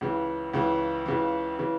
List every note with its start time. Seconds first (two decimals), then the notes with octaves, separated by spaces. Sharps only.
0.01 C#2 C#3 E3
0.53 C#2 C#3 E3
1.06 C#2 C#3 E3
1.59 C#3 E3